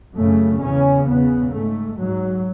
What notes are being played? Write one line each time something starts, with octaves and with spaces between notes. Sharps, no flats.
F#2 C#3 A3
E2 C#3 C#4
E2 C#3 B3
G#2 A3
G#2 F#3